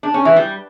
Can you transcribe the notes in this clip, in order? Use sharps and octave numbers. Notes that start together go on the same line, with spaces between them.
D4
C#4
E3
G3